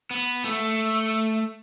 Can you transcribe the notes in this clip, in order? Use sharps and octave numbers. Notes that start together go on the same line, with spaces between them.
B3
A3